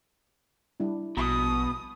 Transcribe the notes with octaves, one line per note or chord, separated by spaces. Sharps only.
G3 D4 E4
A#1 B2 D#6